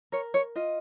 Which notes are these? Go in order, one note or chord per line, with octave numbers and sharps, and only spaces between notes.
A#4 C#5
C#5
F4 D#5